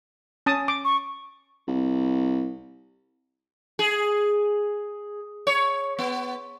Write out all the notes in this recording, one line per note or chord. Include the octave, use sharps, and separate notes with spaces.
C#4 A5 D#6
D6
C#6
C2
G#4
C#5
B3